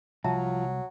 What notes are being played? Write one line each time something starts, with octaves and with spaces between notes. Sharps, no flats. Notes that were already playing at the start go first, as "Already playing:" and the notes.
C2 F3 F#3 E5 A5 A#5